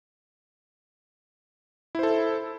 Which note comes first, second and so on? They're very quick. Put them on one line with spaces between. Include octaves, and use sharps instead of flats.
E4 C5 A4